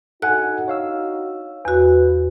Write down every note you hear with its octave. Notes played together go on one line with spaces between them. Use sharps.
D4 D#4 F#4 A4 F#5 G#5 F#6
C#5 F5 E6
E2 F#4 B4